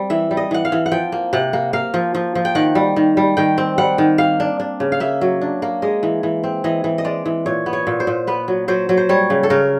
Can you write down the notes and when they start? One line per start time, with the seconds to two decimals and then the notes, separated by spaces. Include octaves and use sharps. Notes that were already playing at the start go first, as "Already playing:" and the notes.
Already playing: G3 C4
0.10 E3 E5
0.31 G3
0.37 D#5
0.51 E3 F#5
0.65 F5
0.72 E3
0.86 F#5
0.92 F3 G5
1.12 A#3
1.33 C3 F#5
1.53 A#3
1.73 A#3 F5
1.94 F3
2.15 F3
2.35 F3
2.45 G5
2.55 D#3 F#5
2.75 G3
2.96 D#3
3.17 G3
3.37 D#3 G5
3.58 C4
3.78 G3 F#5
3.98 D#3
4.18 A#3 F5
4.40 D4
4.60 D4
4.80 C#3
4.92 F5
5.00 A#3 E5
5.21 F#3
5.41 D4
5.62 A#3
5.82 G#3 D#5
6.03 E3
6.23 E3
6.44 C4
6.64 E3 D#5
6.84 E3
6.98 D#5
7.04 G#3 D5
7.26 E3
7.46 A#2 C#5
7.66 B3
7.73 C#5
7.87 A#2
8.00 C5
8.07 A#2
8.27 B3 B4
8.48 F#3
8.68 F#3 C5
8.89 F#3
8.97 C5
9.09 G3 C#5
9.30 C#3
9.43 A4
9.50 C#3 A#4